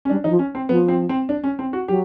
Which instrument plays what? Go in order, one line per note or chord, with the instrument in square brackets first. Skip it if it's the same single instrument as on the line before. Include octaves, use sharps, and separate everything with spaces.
[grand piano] C#4
[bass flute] G3 [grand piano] D4
[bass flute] E3 [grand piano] D#4
[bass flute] F3
[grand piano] C#4
C4
[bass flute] F3 [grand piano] B3
[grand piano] C4
C4
D4
C#4
C4
F#4
[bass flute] F#3 [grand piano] G4